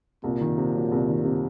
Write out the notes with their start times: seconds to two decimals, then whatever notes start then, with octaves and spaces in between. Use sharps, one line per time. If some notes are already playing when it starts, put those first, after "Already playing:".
0.24 C2 A#2
0.41 D#3
0.58 C3
0.75 F#3
0.92 C2
1.08 D#3
1.25 C3